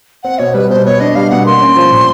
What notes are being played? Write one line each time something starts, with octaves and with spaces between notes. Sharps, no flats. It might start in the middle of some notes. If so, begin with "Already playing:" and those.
C4 F#5
B2 C#5
G3 B4
B2 C5
B3 C#5
D4 D#5
G3 F5
B2 F#5
A#3 C6
C#4
F3
A#2